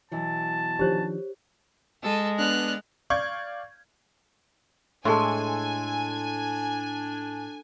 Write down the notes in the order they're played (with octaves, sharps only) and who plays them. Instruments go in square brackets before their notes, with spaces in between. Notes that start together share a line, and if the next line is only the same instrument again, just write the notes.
[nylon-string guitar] B2 E3 F#3 [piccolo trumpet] A5
[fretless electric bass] D#3 F3 D4 [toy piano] G4 C5 C#5
[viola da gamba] G#3 [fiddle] A4
[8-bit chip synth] B3 D4 [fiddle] F6 F#6
[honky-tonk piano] D5 F5 C#6 G6 G#6
[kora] A2 G#3 [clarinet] D4 [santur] A4 C6 [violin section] G#5